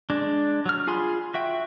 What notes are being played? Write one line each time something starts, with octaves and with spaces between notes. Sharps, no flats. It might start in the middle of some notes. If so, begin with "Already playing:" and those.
G#3 D4
F#3 F6
F4 G#4 G#5 B5 C6
F#4 E5 G5